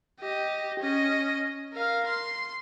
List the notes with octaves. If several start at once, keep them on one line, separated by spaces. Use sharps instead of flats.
G4 D#5
C#4 D#5
A#4 F5
C6